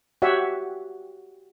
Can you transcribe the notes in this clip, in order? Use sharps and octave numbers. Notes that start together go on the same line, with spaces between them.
F#4 G4 C#5 E5 F#5